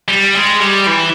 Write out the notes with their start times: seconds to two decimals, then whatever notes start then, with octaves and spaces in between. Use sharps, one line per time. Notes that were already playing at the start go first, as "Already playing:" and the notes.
0.08 G3
0.35 G#3
0.61 G3
0.87 E3